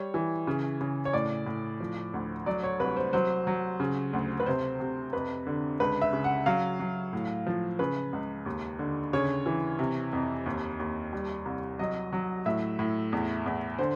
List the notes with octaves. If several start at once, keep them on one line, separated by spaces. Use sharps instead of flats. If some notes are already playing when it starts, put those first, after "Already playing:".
Already playing: G3 C#5
E3
C#3
C#3
C#5
A2 D5
A2
F3
D2
F#3 D5
C#5
C2 B4
C5
F#3 C5
F#3
C#3
D2
B4
C3 C5
C3
F2 B4
D3
C#2 B4
E5
C#3
F#5
F#3 F5
F#3
A2
F3
C#3 B4
C#2
D#2
D3
C#3 C#5
E3
C3
F2
D#2
D#2
G3
C2
F#3 D#5
F#3
A2 E5
A2
E2
E2
D3 C5